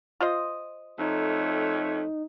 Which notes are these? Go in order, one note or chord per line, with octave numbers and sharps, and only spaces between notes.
F4 C5 D#5
F2 A3 D#4 C#5